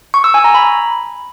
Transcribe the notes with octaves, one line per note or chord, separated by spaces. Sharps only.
C#6
E6
G#5
A#5
B5